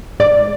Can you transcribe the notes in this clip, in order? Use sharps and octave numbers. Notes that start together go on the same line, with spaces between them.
G#2 D5